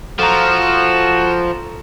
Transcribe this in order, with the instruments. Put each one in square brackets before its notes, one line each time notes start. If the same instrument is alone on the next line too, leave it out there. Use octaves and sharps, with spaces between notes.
[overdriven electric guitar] F3 [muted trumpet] F#4 [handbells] A4 A#5 [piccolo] E7